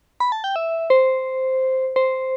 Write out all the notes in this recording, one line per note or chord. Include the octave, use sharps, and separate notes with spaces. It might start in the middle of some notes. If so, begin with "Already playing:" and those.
B5
A5
G5
E5
C5
C5